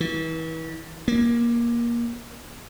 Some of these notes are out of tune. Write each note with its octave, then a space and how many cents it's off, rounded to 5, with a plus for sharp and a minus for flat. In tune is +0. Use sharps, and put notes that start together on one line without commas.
E3 -35
A#3 +20